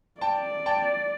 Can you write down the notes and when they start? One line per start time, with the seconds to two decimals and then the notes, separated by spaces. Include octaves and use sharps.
0.21 D5 G5 A5
0.66 G5 A5